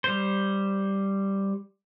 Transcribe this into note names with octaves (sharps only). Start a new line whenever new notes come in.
G3 C5